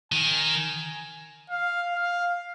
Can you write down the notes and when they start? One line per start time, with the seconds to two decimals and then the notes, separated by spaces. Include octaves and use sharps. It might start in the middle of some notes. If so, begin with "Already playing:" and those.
0.12 D#3 G#5
1.50 F5
1.95 F5